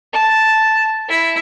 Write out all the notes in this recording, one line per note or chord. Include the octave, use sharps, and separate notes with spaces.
A5
E4